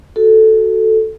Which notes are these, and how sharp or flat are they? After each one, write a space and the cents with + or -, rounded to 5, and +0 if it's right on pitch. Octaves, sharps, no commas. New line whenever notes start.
F#4 +0 A4 +0